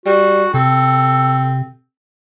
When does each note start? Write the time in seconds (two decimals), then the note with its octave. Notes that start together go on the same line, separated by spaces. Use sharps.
0.06 G3 F#4
0.54 C3 C4 A4